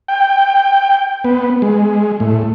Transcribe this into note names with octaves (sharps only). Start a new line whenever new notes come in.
G5
B3
G#3
A2